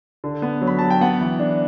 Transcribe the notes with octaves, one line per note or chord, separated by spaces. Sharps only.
D3
B3
F#3
B5
F#3 A5
G5
B3 F#5
E3
D4